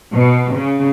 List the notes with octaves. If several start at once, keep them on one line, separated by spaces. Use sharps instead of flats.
B2
C#3